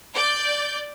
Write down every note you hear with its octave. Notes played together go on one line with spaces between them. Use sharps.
D5 G6